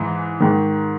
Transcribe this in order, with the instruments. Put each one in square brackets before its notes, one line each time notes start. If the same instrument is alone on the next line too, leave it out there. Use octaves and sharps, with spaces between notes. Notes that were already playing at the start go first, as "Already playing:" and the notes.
Already playing: [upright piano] G#2 E3
G#2 D#3